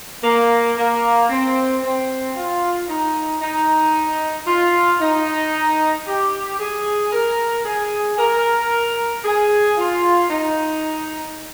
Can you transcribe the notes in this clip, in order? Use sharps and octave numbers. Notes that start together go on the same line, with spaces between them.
A#3
A#3
C4
C4
F4
D#4
D#4
F4
D#4
G4
G#4
A#4
G#4
A#4
G#4
F4
D#4